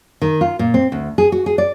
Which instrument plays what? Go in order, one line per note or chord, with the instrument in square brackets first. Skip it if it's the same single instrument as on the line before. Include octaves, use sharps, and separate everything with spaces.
[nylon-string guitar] D#3
F4
A#2
C4
D2
G#4
F#4
G#4
D5